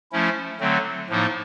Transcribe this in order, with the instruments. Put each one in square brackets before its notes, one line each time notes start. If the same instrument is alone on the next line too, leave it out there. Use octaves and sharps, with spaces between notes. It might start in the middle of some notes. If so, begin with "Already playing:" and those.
[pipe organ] F3 A3 C#4 E4
D3 F#3 A3 C4
A2 F3 A#3 D#4